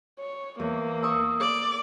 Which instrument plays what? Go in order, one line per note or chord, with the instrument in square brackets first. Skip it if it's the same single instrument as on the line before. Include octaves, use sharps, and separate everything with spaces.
[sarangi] C#5
[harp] E2 [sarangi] A#3
[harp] C#6 D#6 E6
[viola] D5